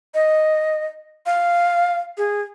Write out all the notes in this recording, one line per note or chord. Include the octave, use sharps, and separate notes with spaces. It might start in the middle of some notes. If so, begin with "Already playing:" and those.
D#5
F5
G#4